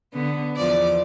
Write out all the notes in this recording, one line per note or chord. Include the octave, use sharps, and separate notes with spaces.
D3 B3
E2 F3 D5